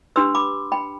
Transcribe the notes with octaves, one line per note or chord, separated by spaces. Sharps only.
D4 G4 B4 C6 E6
B5 D6
G5 B5